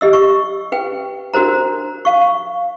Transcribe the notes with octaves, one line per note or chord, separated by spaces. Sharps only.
G4 D#5 E6
C#6
B4 G5
D4 F#4 A#4 C5 A#5
F5 C#6